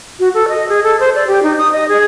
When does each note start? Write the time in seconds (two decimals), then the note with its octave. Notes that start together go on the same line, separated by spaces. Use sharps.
0.20 F#4
0.34 A4
0.49 D#5
0.69 G#4
0.83 A4
1.00 C5
1.15 D5
1.27 G4
1.43 D#4
1.58 D#6
1.72 D#5
1.89 G#4